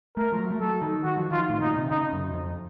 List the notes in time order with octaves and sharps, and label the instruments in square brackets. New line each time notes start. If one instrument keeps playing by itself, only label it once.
[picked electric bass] A3 [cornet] A#4
[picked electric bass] F3
F#3
A3
[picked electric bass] F#3 [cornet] A4
[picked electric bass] D#3
[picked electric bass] D#3 [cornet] F#4
[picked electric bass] F3
[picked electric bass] D#3 [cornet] F4
[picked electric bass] A2
[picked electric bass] A#2 [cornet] D#4
[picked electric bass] C3
[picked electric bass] C#3 [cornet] D#4
[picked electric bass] F#2
F2